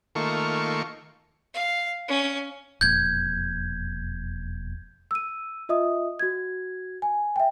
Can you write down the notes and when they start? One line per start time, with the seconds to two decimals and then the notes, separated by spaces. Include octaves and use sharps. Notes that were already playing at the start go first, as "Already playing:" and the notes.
0.15 D#3 A3 A#3 F4 C#6
1.54 F5
2.08 C#4
2.81 E1 F2 A#2 G6 G#6
5.11 E6 D#7
5.69 F4 D#5 E5 D#6
6.19 F#4 G#6
7.02 G#5
7.36 E5 G5